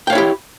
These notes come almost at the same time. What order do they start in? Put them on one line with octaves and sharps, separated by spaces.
G5 F5 C#5 E4 G4